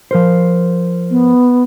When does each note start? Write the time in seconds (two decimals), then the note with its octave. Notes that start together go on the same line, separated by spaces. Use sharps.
0.11 F3 A#4 C5
1.11 B3